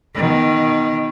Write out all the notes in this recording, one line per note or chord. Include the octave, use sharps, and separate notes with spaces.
B2 D#3